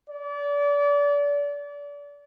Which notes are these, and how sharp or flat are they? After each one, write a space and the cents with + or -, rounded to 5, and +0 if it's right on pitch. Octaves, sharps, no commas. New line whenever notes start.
D5 -30